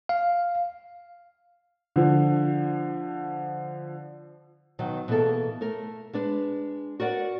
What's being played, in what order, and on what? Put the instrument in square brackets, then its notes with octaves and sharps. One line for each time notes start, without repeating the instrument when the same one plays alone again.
[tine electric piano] F5
[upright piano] D3 F3
[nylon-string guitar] B2 D#3 F#3
B2 E3 A#3 G#4 A4
A3 A#4
G#3 D4 B4
F#4 A#4 D5 F#5